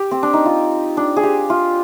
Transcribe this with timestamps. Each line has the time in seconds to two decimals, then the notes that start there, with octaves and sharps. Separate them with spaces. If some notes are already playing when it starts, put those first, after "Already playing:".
Already playing: G4
0.11 C4
0.23 D4
0.33 D#4
0.46 F4
0.97 D4
1.16 G#4
1.23 G4
1.50 F4